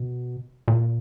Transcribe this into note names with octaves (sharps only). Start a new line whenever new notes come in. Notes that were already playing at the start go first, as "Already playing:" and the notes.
Already playing: B2
A#2